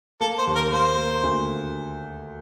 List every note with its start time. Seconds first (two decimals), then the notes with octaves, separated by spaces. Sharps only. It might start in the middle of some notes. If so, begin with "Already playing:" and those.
0.21 A#3 A4
0.38 C5
0.47 D#2
0.55 A#4
0.71 A#3 C5
0.97 A#3
1.23 D2